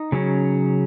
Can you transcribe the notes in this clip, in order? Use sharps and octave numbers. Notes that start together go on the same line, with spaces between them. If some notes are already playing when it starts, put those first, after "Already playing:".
Already playing: D#4
C#3 F#3 C#4